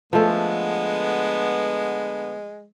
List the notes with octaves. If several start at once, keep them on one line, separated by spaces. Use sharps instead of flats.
D3 F3 G#3 A3 B3